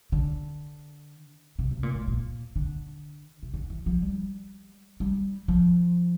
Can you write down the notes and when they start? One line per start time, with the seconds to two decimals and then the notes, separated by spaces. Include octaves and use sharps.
0.12 D3
1.59 C3
1.71 C3
1.83 A#2
1.95 A2
2.08 A#2
2.56 D3
3.43 C3
3.54 D3
3.70 E3
3.86 F3
4.02 G3
5.00 G3
5.48 F3